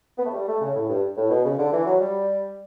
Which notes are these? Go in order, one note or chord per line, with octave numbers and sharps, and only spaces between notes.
B3
A3
G3
A3
C#3
A2
G2
A2
B2
C#3
D3
E3
F#3
G3